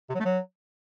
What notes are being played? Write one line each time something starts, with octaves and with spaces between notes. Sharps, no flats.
C3
F#3
A3
F#3